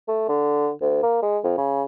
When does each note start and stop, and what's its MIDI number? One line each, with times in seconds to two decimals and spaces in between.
0.08 0.25 57
0.29 0.70 50
0.81 0.99 38
1.03 1.19 58
1.22 1.39 56
1.44 1.55 41
1.58 1.83 49